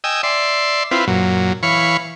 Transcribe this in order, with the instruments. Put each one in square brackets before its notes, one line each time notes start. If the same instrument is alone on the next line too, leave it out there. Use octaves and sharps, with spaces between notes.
[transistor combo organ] D#5 G5 G#5 E6
D5 E5 C6
C4 E4 F4 B4
F#2 A#2 F#3
E3 C#5 F5 B5 C#6